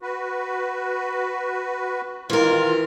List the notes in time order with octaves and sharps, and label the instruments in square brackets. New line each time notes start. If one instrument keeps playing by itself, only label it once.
[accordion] F#4 B4
[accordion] D#3 F4 [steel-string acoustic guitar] E3 A#4